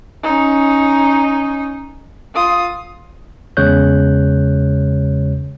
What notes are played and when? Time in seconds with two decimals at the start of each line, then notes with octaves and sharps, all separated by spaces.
0.23 C#4 D#4
2.34 F4 D#6
3.57 E2 C#3 G#3 C#5 F#6 G6